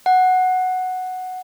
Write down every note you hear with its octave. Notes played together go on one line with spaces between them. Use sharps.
F#5